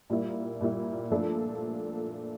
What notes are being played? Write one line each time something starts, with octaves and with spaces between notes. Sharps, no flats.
A#2 G3 A#3 E4
A#2 G3 A#3 E4
A#2 F3 A3 D4 A4